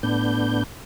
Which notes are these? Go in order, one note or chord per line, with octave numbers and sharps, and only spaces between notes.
A2 B3 D4 G6